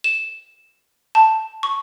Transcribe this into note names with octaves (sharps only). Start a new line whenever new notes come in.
E7
A5
C#6